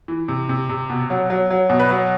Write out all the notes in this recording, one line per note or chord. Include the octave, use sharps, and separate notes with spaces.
E3
C3
C3
C3
B2
F#3
F#3
F#3
B2
B4
F#3